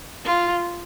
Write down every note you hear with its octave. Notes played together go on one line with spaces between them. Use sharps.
F4